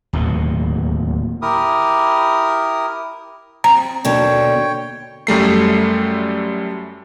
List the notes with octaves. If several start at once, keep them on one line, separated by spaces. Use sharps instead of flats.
D1 D#2 B2
E4 G4 A#4 D#6
C4 A#5
D#2 B2 D3 C#5 G5
F#2 G3 A3 C7